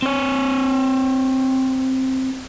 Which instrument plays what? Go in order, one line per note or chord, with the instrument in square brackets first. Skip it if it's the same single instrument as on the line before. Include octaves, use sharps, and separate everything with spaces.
[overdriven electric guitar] C4 C#5